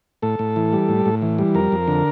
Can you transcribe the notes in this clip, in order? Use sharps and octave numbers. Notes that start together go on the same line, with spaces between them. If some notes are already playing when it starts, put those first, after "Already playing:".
A2 A4
A2
E3
G3
A2
A2
E3
G3
F2 A#4
F2
D3